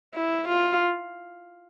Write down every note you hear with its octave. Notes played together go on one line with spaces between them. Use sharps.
E4
F4